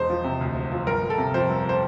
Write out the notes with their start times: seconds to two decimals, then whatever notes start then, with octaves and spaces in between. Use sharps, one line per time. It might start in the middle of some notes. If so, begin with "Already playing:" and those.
Already playing: E1 C5
0.10 F3
0.24 C3
0.41 D2
0.55 E1
0.72 F3
0.87 G1 A#4
1.02 G1
1.10 A4
1.18 C3
1.34 F2 C5
1.50 G1
1.69 C5